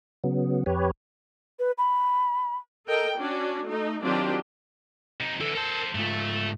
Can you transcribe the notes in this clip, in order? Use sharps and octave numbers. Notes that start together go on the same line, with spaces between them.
C#3 F#3 B3
F2 G4 B4 C#5
B4
B5
A4 A#4 D#5 G5
C#4 D4 F#4
A3 D#4
D#3 F#3 C4 D4 F4 G4
C3 D#4
D3 E3 A4
A4 A#4 C5 A5
G#2 A3 F4